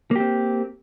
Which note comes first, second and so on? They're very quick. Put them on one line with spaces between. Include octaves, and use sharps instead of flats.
A#3 G4 C4